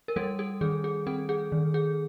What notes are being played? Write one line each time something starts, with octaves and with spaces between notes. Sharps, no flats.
A#4
G3 A4
A4
D#3 G#4
G#4
C4 A4
G#4
D#3
G#4